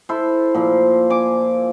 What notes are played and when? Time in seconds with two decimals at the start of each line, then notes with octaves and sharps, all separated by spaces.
0.09 E4 A4 C5
0.54 A#2 F3
1.10 G#5 D6